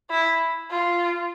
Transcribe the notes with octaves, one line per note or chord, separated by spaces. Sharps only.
E4
F4